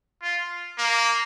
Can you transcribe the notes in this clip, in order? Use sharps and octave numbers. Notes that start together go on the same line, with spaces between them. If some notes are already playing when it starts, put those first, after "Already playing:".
F4
A#3